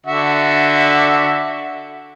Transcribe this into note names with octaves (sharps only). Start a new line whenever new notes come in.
D3 F#4 E5